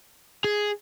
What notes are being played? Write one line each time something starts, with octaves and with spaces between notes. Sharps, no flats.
G#4